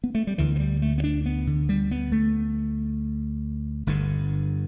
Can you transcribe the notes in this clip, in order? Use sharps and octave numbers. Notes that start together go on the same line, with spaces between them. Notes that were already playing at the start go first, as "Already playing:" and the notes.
B3
A3
G3
D2 D3 E3
E3
G3
A3
B3
D4
B3
D3
G3
B3
A3
G1 G2 D3